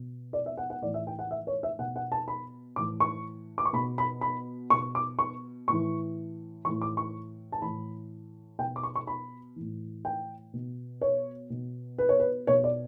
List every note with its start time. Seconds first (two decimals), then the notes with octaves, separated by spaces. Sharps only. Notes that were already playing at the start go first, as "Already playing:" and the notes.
Already playing: B2
0.33 D5
0.46 E5
0.58 F#5
0.70 F#5
0.82 A2 E3 D5
0.94 E5
1.07 G5
1.19 F#5
1.31 E5
1.47 C#5
1.63 E5
1.79 B2 F#5
1.96 F#5
2.12 A5
2.28 B5
2.76 A2 E3 D6
3.00 C#6
3.58 D6
3.65 C#6
3.73 B2 B5
3.98 B5
4.21 B5
4.70 B2 C#6
4.95 D6
5.19 C#6
5.68 A2 E3 C#6
6.65 E3 C#6
6.69 A2
6.82 D6
6.97 C#6
7.52 A5
7.62 A2 E3 B5
8.59 B2 G5
8.76 D6
8.83 C#6
8.96 C#6
9.07 B5
9.56 A2 E3
10.05 G5
10.53 B2
11.01 C#5
11.50 B2
11.98 B4
12.09 C#5
12.20 B4
12.47 B2 C#5
12.64 D5